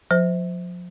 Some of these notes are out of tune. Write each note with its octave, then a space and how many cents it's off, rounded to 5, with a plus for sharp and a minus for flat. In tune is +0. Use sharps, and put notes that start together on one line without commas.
F3 +40 C5 -20